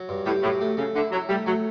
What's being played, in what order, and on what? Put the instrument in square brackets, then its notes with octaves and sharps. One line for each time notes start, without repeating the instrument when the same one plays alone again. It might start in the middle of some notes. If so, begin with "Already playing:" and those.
Already playing: [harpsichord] F#3
G2
[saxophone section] A2 [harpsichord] G4
[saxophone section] A2 [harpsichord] F#3
[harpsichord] A3
[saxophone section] C#3 [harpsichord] A3
[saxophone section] D3 [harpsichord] E4
[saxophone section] F#3 [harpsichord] E4
[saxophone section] G3 [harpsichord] A3
[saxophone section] F#3 [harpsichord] A3